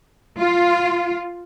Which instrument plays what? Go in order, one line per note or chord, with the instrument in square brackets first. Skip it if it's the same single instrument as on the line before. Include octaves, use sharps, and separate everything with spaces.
[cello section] F4